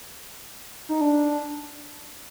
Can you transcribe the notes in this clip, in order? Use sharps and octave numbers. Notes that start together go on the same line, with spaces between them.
D#4
D4